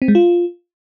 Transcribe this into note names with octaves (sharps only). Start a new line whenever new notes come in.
C4
G#3
F4